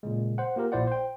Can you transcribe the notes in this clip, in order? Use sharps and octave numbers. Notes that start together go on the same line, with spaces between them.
A#2 C#3 G#3
C5 F#5
A#3 F4 G4 A#4
A#1 A#2 E4 C5 D5 F#5
C5 G5